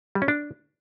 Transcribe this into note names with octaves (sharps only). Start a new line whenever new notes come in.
G3
C#4
D4